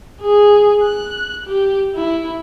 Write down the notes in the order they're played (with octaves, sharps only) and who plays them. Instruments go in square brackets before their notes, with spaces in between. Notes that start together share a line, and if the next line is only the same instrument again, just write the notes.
[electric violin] G#4
F#6
G4
E4